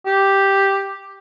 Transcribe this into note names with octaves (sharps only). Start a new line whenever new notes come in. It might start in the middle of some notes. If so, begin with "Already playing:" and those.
G4